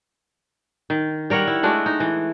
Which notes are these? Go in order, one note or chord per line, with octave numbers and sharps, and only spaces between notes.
D#3
G3 A#4 C#5 F#5
E4
G#3 A3 D4 F#4
D#4
E3